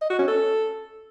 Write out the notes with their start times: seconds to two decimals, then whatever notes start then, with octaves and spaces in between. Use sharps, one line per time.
0.01 D#5
0.10 F#4
0.19 C#4
0.27 A4